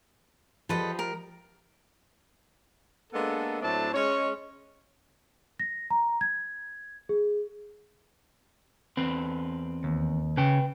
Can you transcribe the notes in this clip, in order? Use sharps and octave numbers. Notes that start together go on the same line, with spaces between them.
F3 G3 A4 B4 D#5
A#4
G#3 A#3 B3 D4 A4
A2 F#3 A3 C4 D4 A5
G#3 C#4 C#5
A#6
A#5
G#6
G#4
E2 C4 B4
D#2
C#3 B4 G5